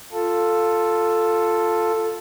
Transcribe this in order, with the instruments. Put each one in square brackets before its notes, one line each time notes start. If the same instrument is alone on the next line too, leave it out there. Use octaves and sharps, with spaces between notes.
[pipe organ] F4 A4